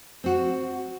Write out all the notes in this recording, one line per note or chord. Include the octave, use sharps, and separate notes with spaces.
C4 F#4